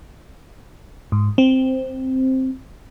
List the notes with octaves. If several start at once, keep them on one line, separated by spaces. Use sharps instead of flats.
G#2
C4